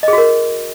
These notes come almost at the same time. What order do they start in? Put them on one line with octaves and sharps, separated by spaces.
D#5 G#4 F#4 A#4